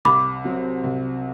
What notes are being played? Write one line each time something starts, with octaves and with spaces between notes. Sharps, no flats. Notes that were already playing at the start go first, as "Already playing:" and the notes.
C2 B5 D6
C3 F#3 C4
C2